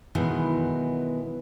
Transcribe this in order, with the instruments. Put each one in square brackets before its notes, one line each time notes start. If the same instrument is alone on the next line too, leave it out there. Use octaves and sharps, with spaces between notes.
[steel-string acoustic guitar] B2 D#3 E3 F#3 G#3 B3